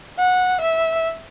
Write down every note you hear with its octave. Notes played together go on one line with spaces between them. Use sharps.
F#5
E5